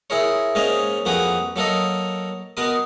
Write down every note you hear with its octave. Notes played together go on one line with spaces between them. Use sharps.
E4 G#4 A#4 C#5
G#2 A#3 C#4 D#5 G#5
F2 A#3 F#4 G#4 B4
F#3 A#3 A4 A#4 D#5
B2 B3 A#4 D#6